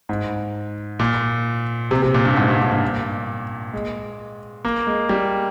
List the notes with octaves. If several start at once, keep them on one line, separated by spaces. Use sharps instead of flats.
G#2
A#2
C3
C3
A#2
G2
G#2
G2
G#2
A#2
G#3
A#3
G#3
G3